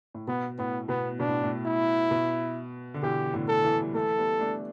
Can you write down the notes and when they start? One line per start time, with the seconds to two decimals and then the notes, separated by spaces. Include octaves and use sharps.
0.14 A2
0.27 B2 B3
0.59 A2 B3
0.89 B2 B3
1.20 B2 D4
1.28 A2
1.43 A2
1.66 E4
2.11 B2
2.94 D3
3.03 B2 E3 G4
3.34 A2 D3
3.48 A4
3.63 E3 A3
3.82 G3
3.94 E3 A3 A4
4.18 G3 B3
4.40 A3 D4